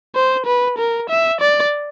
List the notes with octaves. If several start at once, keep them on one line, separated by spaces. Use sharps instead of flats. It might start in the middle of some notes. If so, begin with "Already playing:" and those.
C5
B4
A#4
E5
D5